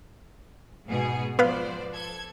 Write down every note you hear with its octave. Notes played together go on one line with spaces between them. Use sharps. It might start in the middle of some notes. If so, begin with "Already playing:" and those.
G#2 B2 G#4
F3 B3 B4 C5 D5 F5
A4 G#6